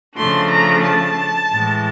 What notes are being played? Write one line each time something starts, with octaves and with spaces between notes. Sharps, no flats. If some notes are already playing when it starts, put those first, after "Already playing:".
C#3 F3 A3 D4 C6
A#5
A5
A2 E3 G#3